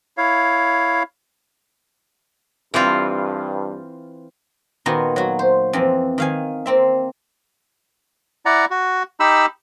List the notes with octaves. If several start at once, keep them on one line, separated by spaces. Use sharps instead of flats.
E4 C#5 F5
G2 E3 C4 F4
A#2 D#3 A#3 B3 D#4 F#4
F#3 F#4
C5
F2 E3 C4
D#3 F5 G#5
A#3 C4 E5
E4 D5 F#5 A#5
F#4
D#4 G4 B5 E6